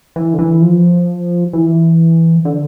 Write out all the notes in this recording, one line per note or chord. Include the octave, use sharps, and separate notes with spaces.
E3
D3
E3
F3
E3
D3